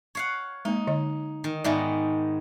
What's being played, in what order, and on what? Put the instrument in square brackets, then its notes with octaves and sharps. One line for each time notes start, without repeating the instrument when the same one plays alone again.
[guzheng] C#5 F5 F#5
[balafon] G#3 A#3 [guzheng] D#4
[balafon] D3 D#5
[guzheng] D#3
[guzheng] G#2 D#3 B3 [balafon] D5 E5 G#5